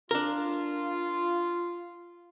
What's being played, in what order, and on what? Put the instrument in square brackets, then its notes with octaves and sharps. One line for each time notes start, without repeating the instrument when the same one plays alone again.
[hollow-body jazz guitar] D4 A#4 [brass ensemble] F4